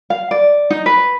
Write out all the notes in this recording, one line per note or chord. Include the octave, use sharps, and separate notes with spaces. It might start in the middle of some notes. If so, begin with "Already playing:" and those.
F5
D5
D#4
B4